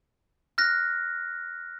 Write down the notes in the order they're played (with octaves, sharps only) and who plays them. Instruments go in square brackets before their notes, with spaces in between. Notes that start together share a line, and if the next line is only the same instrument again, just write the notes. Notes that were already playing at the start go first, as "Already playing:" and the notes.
[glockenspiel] F6 F#6 A#6